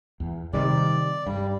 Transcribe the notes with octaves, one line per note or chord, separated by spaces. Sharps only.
E2
C3 D#3 G3 D5
G2 G3